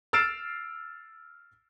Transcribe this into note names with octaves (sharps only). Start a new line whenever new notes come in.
E6 F6 A6 C7 D7 E7